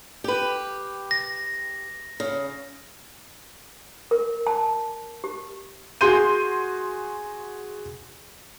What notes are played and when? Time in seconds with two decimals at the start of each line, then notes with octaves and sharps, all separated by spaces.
0.24 G4 B4
1.11 A#6
2.20 C#3
4.11 A#4
4.47 A5
5.24 G4
6.01 F#4 G#4 C6 G6 D#7